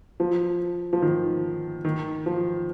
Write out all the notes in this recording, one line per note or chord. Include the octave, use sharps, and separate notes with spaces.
F3
F3
D#3
D#3
F3